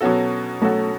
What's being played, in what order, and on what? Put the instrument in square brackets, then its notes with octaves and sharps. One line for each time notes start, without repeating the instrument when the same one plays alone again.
[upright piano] B2 F#3 C#4 F#4 A4 [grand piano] B3
[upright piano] B2 F#3 C#4 F#4 A4 [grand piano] A3